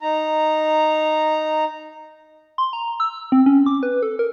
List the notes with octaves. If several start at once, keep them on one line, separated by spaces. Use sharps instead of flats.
D#4 A#5
C6
A#5
E6
C4
C#4
D6
B4
A4
A#4